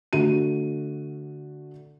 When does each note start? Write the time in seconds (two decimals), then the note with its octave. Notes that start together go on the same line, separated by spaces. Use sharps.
0.13 D3 A3 F#4 D#7